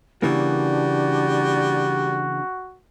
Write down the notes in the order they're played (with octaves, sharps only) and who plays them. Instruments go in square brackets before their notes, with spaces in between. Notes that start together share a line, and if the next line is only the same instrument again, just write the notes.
[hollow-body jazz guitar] C#3 E3 A#3 [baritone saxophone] G3 [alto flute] D4 [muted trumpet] F#4